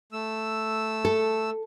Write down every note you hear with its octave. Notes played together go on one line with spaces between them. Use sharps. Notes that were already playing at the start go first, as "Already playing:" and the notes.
A3 E6
A4